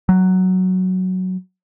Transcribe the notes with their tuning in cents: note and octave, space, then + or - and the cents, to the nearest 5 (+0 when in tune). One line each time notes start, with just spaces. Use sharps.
F#3 +5